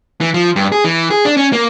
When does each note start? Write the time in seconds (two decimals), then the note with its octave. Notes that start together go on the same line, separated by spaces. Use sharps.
0.21 E3
0.34 F3
0.56 G2
0.72 G#4
0.85 E3
1.11 G#4
1.25 D4
1.37 C#4
1.53 A#3